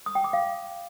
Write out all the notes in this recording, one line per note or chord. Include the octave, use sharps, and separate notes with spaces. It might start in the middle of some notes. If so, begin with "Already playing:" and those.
D#6
G5
D6
F5